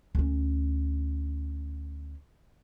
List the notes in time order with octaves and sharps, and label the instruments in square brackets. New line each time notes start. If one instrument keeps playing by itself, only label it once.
[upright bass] D2 C#4